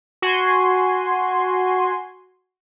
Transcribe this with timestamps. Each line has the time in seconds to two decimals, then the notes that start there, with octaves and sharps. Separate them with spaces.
0.22 F#4 G#5 C6